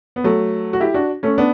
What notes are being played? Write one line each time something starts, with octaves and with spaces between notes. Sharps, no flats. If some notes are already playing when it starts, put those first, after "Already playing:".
B3
F#3 A3
F#4
E4 G4
D4 F#4
A3 C#4
B3 D4